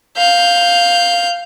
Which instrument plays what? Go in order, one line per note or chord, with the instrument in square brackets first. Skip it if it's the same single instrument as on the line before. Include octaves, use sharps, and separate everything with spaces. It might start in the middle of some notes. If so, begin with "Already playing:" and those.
[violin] F5 G6